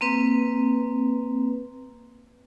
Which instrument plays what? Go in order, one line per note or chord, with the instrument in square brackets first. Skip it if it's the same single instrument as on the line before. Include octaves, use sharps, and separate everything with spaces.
[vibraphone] A#3 C4 B4